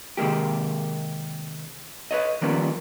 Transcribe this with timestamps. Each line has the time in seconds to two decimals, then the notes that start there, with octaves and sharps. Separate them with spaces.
0.17 C3 D#3 G#3 A#3 G4
2.11 B4 C#5 D#5
2.41 D#3 F3 G3 A#3 B3 C#4